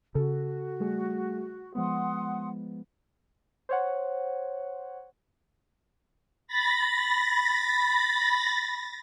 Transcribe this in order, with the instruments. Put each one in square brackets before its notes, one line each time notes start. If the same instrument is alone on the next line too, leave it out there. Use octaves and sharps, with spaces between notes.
[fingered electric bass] C#3 [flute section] F#4 [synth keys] A4
[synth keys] G3 A3 G#4
[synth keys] F3 G#3 B3 [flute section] F#5 C6 D#6
[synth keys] C5 C#5 F#5
[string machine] B5 A6 A#6